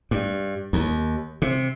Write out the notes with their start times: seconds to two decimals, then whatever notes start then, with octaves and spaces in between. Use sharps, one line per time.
0.11 G2
0.73 D#2
1.42 C3